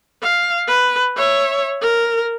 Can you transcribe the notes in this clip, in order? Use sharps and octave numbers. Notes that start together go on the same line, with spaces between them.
F5
B4
C#5 E5
A#4